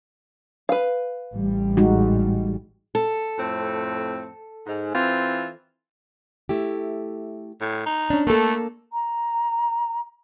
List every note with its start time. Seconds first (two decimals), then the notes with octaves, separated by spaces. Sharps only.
0.69 B4 F5
1.33 A1 G3
1.77 G#3 D#4 F#4
2.95 A4
3.36 F2 A2 C4
4.66 G#2
4.93 E3 C4 F4
6.49 A3 E4 G4
7.61 A2
7.86 D#4
8.10 C#4 D4
8.27 A3 A#3 A4
8.93 A#5